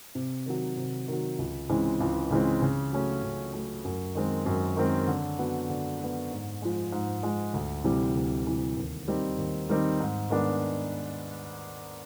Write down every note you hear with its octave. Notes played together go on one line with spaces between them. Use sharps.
C3
D#3 F#3
C3
D#3 F#3
C#2
C#3 E3 G#3 C4
C#2
C#3 E3 G#3 C4
C#3
F#3 A3 C#4
C#3
F#3 A3 C#4
F#2
D#3 G#3 C4
F#2
D#3 G#3 C4
D3
F#3 B3
D3
F#3 B3
G#2
F3 G#3
G#2
F3 G#3
D2
C3 E3 G3
D2
C3 E3 G3
D#2
D#3 G3 C4 D#4
D#2
D#3 G3 C4 D#4
G#2
D#3 G#3 B3 D4